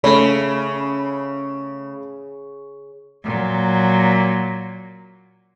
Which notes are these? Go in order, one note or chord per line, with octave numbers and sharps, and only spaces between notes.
C#3 A3 C#5 B5
A#2 F#3